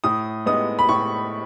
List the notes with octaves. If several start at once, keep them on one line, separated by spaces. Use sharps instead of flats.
A2 D#6
G#3 B3 D#4 D#6
B5
A2 C#6